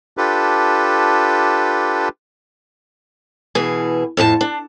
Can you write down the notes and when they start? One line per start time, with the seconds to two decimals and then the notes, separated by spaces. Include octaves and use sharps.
0.17 D4 F4 G4 A4 B4
3.55 B2 E3 G#4
4.17 F2 A2 G4 A5
4.41 D4